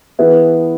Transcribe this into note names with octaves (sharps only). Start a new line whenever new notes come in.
E3 B3 E4 G#4 B4